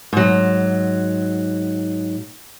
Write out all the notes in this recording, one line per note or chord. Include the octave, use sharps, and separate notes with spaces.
G#2 F#3